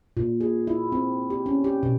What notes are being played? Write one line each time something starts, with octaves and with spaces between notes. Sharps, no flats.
A#2
G#4
E4
C4
G4
C#4
G4
B2